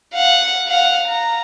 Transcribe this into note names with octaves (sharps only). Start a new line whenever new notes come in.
F5 F#5
F5 F#5
A#5